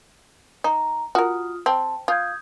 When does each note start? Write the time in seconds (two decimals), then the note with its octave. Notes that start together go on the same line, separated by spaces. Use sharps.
0.64 D#4 A#5
1.15 F4 F#4 A#4 D#6 F6
1.66 C4 G5 A5
2.08 F4 D#6 G6 G#6